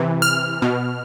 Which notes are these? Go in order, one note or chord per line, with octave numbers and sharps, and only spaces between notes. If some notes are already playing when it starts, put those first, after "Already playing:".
Already playing: C3 E3
F6
B2